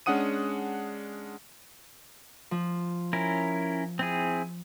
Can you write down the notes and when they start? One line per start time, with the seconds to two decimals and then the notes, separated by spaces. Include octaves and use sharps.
0.06 G#3 C#4 D4 F#5 D#6 D#7
2.51 F3
3.13 C#4 E4 A#4
3.99 C4 E4 G#4